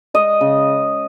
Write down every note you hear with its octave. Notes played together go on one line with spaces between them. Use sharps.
G#3 D#5
C#3